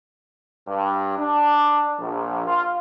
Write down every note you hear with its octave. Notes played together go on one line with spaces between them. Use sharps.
G2
D4
A#1
F4